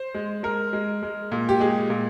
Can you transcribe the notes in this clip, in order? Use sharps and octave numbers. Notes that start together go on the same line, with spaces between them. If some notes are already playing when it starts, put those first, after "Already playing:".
Already playing: C5
G#3
G#3 A#4
G#3
G#3
A#2
G4
G#3 G#4
A#2